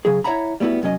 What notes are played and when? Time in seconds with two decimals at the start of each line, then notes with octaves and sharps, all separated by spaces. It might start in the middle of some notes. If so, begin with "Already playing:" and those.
0.05 C#3 F#3 G#4
0.24 E4 C#5 E5 F#5 A#5 B5
0.60 G3 A3 B3 E4 F#4
0.82 C2 F#2 F#3 C#4 D#5